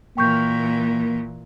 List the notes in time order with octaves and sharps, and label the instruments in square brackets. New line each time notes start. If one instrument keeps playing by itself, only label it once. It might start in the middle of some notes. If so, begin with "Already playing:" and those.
[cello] A#2 E3 [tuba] A#3 [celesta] G5 C#6 G6